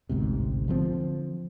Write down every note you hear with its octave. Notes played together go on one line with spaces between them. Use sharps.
A1 D2 G#2 C3
D3 F3 G3 C4